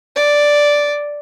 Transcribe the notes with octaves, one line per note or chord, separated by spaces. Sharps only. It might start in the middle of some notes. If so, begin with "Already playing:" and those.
D5